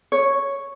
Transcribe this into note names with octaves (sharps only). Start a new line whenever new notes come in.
C#5